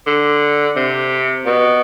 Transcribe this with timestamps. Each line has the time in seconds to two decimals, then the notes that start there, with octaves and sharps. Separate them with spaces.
0.07 D3
0.76 C3
1.46 B2